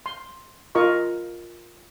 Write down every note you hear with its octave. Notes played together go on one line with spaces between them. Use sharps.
C6
F4 A#4 D#5 C#6